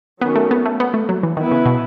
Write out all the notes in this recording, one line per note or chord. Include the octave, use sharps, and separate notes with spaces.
D#3 F#3 B3 C#4
A3
B3
A3
B3
A3
F#3
E3
D#3 B3 E4 B4
C#3
B2